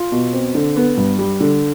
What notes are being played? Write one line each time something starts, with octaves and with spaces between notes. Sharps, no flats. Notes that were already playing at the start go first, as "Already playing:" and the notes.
Already playing: F4
B2
C4
D3
B3
G2
G3
D3